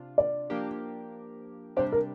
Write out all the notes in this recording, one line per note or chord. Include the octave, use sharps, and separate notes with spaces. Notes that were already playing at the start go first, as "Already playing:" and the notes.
Already playing: C3 D4 F4
D5
F3 A#3 D4 G4 A#4
C3 G3 D4 G4 C5
A#4